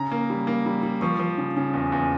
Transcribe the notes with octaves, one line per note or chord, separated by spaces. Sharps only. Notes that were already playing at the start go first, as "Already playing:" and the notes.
Already playing: C#3 A#5
A#3
G3
A#3
G3
G3
F3 C#6
F3
C#3
C#3
E2
E2